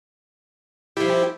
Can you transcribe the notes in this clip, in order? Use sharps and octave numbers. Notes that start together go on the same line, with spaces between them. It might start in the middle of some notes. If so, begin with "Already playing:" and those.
F3 G3 E4 G4